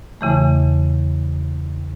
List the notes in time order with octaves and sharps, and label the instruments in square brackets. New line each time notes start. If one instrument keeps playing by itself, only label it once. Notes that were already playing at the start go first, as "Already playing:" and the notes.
[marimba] E2 C#3 E3 A3